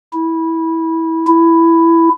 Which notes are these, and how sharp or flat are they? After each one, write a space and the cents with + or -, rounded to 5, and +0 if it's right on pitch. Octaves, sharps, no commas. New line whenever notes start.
E4 -15
E4 +10